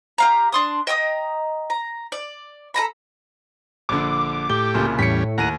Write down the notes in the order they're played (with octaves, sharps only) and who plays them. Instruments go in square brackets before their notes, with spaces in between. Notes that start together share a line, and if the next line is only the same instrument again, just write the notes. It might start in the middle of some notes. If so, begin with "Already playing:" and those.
[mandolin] G4 F5 A#5
D4 C6 D#6
D#5 G5 A#5 D#6
A#5
D5
A4 G#5 A#5 B5
[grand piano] A#1 D3 [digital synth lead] D6
[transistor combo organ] A2 G4 [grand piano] G7
[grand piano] C2 A#2 C#3
[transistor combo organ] E2 G3 C#4 [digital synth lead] A2 [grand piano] B6 C#7
[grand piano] D#2 A#6 D#7 [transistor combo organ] F#5 A#5